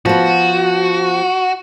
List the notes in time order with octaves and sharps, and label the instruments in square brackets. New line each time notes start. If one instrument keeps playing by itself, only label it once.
[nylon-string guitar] F3 B3 [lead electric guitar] F#4